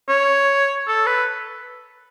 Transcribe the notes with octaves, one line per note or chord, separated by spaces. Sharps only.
C#5
A4
B4